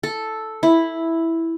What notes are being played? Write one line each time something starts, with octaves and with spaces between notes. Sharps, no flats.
A4
E4